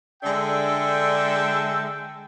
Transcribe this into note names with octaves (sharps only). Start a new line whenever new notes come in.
D3 G#3 D4 A4 E5 G5